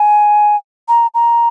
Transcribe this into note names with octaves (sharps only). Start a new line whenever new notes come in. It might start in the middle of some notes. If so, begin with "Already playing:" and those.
Already playing: G#5
A#5
A#5